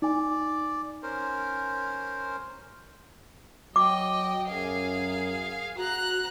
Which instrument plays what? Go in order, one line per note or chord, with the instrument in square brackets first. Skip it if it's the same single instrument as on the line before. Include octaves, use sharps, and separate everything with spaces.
[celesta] D#4 G#5 [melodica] D5
[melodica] C#4 A#4 C5
[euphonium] F#3 [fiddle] D#5 G5 [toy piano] D6
[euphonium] F#2 [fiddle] G#4 F5
[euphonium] F#4 [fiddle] A#5 F#6